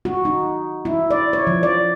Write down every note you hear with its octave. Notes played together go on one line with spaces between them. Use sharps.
F#4
D#4
E4
D5
C#5
F3
D5